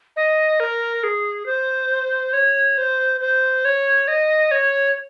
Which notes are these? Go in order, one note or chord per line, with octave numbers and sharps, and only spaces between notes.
D#5
A#4
G#4
C5
C#5
C5
C5
C#5
D#5
C#5